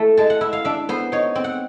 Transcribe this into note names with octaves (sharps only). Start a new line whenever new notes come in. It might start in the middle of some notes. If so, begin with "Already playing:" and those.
Already playing: A3 E4
G#3 A5
F#5
E4 E5
F5
D4 E5
B3 C5
D#4 C#5
C4
F#5